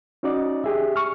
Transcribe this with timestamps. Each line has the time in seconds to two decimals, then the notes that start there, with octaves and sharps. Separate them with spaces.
0.23 C#4 D#4 F#4 D5 D#5
0.64 G4 G#4 E5
0.96 C#6 F6